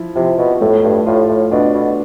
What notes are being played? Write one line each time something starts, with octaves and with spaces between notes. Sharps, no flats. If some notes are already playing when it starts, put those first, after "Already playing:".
Already playing: F3 E4
C3 F3
B2
A2 A3
G2
A2 F4
A2
B2 D4
B2